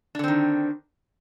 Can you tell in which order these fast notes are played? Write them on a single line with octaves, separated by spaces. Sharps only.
D4 D3 C4 D#3